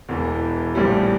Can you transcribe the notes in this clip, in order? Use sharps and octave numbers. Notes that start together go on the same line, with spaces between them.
E1 E2 E3
A#1 A2 E3 G3